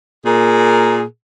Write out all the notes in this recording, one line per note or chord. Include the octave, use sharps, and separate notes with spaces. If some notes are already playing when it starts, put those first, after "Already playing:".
A#2 G#4 A#4